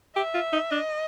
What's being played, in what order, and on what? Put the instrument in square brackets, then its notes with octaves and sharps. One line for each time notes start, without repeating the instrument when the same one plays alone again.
[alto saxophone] G4 [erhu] E5
[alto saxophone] F4
D#4
[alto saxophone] D4 [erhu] D#5